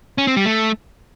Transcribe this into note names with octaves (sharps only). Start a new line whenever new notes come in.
C#4
C4
G3
A3